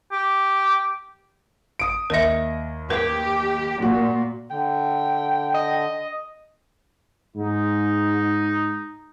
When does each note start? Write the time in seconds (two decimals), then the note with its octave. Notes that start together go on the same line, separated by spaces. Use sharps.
0.12 G4
1.79 D#6 D7
2.10 D#2 A#4 D#5 E5 A#6
2.90 G4 A#4 B4
3.82 A#2 F#4
4.51 D3 G5
5.54 D#5
7.36 G#2 D#4